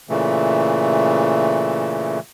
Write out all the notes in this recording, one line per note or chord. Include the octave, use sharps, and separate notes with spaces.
A#2 C#3 E3 A3